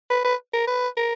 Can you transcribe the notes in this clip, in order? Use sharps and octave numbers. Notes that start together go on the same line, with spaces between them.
B4
B4
A#4
B4
A#4